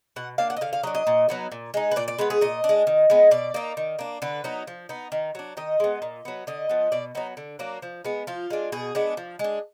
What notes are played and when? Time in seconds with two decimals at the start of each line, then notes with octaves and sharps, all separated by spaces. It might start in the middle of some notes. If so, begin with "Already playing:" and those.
0.16 B2 F#5
0.38 A#3 D4 F5
0.50 F#5
0.56 D#5
0.61 D3 F5
0.73 F5
0.83 F#3 D#5
0.87 D4
0.95 D#5
1.07 A#2
1.29 F#3 B3 D#4
1.52 A#2
1.74 G#3 D#4
1.91 B4
1.96 A#2 D5
2.08 D5
2.18 G#3 B3 B4
2.30 G#4
2.41 A#2 D#5
2.64 D4
2.69 G#3
2.87 D#3
3.10 G#3 B3
3.31 B2 D5
3.54 A#3 D#4
3.77 D#3
3.99 A#3 D4
4.22 D3 B4
4.44 F#3 B3 D#4
4.67 F3
4.89 B3 D#4
5.12 D#3
5.35 F#3 D4
5.57 D#3 D#5
5.80 G#3 B3
6.02 A#2
6.25 F#3 B3
6.47 D3 D#5
6.69 F3 B3
6.92 B2 D5
7.15 F#3 B3 D#4
7.37 D3
7.59 F#3 A#3 D4
7.82 F3
8.05 G#3 B3
8.27 F3 F4
8.50 G#3 D4
8.72 B2 G#4
8.95 G#3 B3 D4
9.17 F3
9.39 G#3
9.44 D4